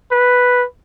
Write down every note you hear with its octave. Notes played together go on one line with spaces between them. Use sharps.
B4